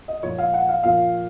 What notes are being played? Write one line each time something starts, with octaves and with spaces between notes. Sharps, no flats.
D#5
A#2 F3 C#5
F5
F#5
F5
A#2 F3 F5